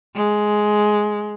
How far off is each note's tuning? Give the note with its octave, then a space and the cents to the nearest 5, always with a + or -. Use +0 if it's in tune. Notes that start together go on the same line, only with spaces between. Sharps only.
G#3 +10